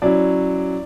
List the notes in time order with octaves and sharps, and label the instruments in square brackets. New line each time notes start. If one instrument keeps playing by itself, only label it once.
[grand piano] F#3 C#4 E4 D5